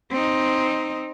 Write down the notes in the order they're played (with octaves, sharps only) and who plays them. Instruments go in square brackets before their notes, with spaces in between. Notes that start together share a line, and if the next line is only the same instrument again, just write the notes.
[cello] C4 D#4